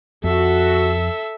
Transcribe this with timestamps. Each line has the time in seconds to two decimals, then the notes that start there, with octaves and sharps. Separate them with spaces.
0.24 F2 F#4 A4 E5